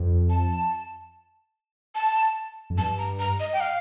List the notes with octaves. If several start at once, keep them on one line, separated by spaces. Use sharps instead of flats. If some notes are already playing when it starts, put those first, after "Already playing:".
Already playing: F2
A5
A5
F2
G2 A5
A#5
A#5
D#5
G5
F5